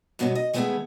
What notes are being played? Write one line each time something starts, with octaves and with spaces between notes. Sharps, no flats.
G2 B2 F#3 B3 C#4
D#5
D#3 G#3 A3 B3 E4 G#4